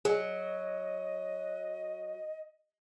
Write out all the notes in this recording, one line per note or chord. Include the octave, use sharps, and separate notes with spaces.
F#3 G#4 D#5